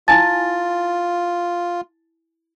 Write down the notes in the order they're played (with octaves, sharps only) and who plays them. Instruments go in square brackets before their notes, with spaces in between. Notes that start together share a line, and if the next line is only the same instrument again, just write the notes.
[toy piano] E4 G#5 A5 [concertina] F4 [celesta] A6